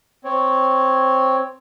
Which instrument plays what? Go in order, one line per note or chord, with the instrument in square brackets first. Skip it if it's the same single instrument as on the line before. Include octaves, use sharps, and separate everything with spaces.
[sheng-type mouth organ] C4 C#5